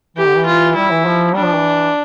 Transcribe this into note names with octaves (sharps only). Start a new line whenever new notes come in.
E3 G4
D3
E3
F4
G3 E4
E3
F3
G3 D4
F3
E3